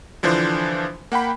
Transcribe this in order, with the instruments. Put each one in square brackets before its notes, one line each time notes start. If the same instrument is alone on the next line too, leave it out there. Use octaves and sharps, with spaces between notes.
[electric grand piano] D3 E3 F3 D4 C5
A#3 F#5 G5 B5